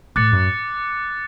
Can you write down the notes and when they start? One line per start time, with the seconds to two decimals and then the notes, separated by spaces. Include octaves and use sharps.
0.16 A2 D6 F#6 A6 C#7
0.32 F#2